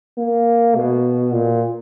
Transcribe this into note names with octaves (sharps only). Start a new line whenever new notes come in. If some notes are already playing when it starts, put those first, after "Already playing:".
A#3
B2
A#2